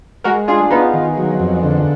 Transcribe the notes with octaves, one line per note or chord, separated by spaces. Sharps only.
G#3 F#4 A#4
D4 F4 G#4
B3 D#4 F4
D#3
F#3
F2
D3